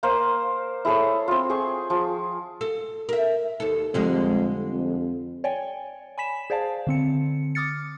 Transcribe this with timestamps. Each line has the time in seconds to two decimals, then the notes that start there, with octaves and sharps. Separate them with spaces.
0.03 A#3 A#4 C5 F5
0.85 E4 G#4 A4 C#5
1.28 C4 F4
1.49 G#4 G5 C#6
1.90 F3
2.61 A4
3.09 A#4 E5
3.60 D#2 A4
3.94 F2 D3 G3 G#3
4.73 F2
5.44 C#5 D5 G5 G#5
6.18 G#5 B5 B6 E7
6.50 G#4 C5 D5 F5 A5
6.87 D3 C4 C#7
7.55 D6 D#6 F6 A6 C#7